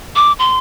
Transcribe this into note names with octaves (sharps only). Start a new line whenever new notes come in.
D6
C6